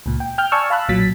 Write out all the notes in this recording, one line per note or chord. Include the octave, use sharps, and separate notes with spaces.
C#2 A#2
G5
G5 F6 G6
D5 G#5 A5 C#6 E6 F6
F5 A5 B5 E6 F#6
B1 A#2 F#3 A6 B6